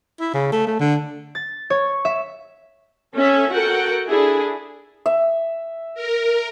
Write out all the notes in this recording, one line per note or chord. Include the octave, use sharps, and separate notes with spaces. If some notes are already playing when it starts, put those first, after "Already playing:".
E4
C#3
A3
A3
D3
A6
C#5
E5
C#4 A4 E5
F#4 A4 A#4 F#5 G5
D4 E4 G#4 A4
E5
A#4